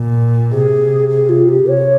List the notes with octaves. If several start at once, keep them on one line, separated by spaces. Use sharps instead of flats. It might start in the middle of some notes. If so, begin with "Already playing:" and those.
Already playing: A#2
C3 G#4
G#4
F4
G4
C3 C#5